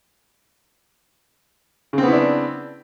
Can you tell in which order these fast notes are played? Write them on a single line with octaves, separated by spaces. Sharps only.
C#3 C4 B3 E4 D4